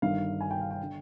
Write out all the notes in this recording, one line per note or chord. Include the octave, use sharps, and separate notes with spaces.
G1 G2 D#3 F5
G#5
G5
F5
G5
D3